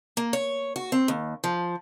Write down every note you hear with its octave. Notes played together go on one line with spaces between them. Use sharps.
A#3
C#5
F#4
C4
D#2
F3